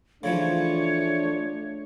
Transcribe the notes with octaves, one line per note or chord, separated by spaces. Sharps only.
C#3 E3 F3 A3 D4 C#5